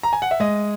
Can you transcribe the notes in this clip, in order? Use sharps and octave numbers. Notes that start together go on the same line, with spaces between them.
A#5
G#5
F#5
E5
G#3 D#5